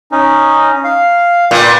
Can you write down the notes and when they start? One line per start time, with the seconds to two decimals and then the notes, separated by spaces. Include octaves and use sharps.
0.12 C#4 D#4
0.84 F5
1.51 A#2 B4 G5